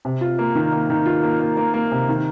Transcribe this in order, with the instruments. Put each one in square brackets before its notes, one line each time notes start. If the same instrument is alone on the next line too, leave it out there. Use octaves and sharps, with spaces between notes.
[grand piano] C3
F4
A#3
D#3
A#3
D#3
F4
A#3
A#3
A#3
A#3
C3
D#3